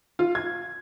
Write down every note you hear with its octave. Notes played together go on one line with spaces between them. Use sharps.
F4
G#6